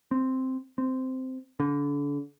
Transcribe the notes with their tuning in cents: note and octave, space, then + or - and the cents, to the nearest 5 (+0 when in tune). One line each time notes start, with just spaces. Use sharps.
C4 -5
C4 -10
D3 -35